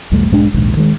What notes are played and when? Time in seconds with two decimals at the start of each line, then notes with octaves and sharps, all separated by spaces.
0.12 B1 E2 G3 A3
0.30 B1 G#2 G#3 D4
0.54 A#1 D#2 G#2
0.77 D#3 G#3